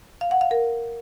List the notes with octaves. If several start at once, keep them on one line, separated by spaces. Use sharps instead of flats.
F5
F#5
F5
A#4